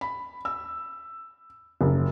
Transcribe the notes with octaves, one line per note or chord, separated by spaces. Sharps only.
B5
E6
F#1